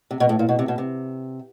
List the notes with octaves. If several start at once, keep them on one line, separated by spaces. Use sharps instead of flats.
C3
B2
A2
A#2
B2
C3
B2
C3